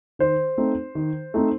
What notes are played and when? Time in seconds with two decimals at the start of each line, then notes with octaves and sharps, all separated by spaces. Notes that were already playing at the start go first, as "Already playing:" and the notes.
0.19 D#3 C5
0.58 A3 C4 D#4
0.95 D#3
1.34 A3 C4 D#4